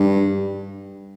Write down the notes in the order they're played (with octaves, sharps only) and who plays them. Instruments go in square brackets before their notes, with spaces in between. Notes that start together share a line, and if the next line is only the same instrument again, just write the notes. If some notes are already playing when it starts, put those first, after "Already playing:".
Already playing: [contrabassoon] G2